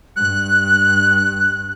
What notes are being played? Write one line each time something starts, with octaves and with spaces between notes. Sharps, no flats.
G2 F#6